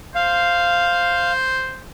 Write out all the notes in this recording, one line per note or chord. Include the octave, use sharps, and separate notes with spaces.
C5 F5